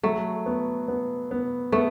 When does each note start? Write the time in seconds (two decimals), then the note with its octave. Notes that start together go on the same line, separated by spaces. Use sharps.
0.03 F#3 A3
0.46 B3
0.88 B3
1.31 B3
1.72 A3 B3